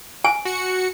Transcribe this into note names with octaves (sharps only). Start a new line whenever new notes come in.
G#5
F#4 C#7